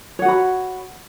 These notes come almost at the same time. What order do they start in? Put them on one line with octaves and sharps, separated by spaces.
C#5 F#5 F#4 B5